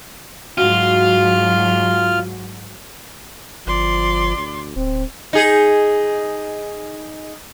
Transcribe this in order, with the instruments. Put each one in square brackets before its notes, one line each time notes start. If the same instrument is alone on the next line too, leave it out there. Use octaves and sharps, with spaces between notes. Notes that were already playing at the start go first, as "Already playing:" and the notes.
[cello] G#2 F#3 [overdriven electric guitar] F4 [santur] F#4 [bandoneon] F6
[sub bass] G1 [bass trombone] F3 [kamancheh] D5 C6
[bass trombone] D2
[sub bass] D1 [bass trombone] C4
[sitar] D#4 G#4